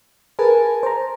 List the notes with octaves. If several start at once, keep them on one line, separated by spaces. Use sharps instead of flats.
G#4 A#4 B4 G#5 A5
C5 A#5